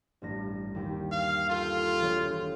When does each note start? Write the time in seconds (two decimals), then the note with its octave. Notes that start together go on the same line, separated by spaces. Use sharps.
0.22 A1 G2 A#6
0.75 D#2 G4
1.12 F5
1.49 F4 A4 G6
1.99 E1 C#5